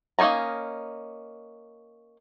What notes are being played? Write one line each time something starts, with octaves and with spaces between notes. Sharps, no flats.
A#3 C#4 D#4 G#5 A#5